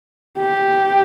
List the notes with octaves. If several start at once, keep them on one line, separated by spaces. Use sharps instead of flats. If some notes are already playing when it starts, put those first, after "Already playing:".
G4